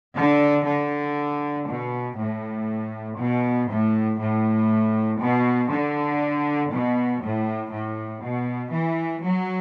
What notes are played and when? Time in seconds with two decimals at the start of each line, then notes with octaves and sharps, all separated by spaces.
0.15 D3
0.66 D3
1.66 B2
2.17 A2
3.18 B2
3.68 A2
4.19 A2
5.19 B2
5.70 D3
6.71 B2
7.21 A2
7.71 A2
8.22 B2
8.72 E3
9.23 F#3